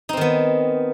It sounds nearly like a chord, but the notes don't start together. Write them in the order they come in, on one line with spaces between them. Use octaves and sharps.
D#4 C4 D#3 B3